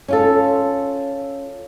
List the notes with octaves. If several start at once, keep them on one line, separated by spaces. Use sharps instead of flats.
C#4 F4 A4